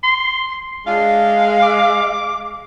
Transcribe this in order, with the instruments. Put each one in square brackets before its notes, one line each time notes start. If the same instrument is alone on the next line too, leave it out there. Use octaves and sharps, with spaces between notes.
[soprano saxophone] C6
[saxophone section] G#3 F5 [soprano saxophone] D4
[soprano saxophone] D6